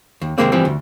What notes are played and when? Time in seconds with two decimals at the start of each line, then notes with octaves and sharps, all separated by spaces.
0.21 D#2
0.38 D#2 G#2 C3 G#3 A#3 C4
0.52 E3 F3 G3 C4
0.65 D2